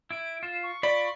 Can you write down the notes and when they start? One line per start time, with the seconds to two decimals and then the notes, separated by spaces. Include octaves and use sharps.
0.11 E4 D7
0.43 F4 E7
0.63 C#6
0.83 F4 D5 B5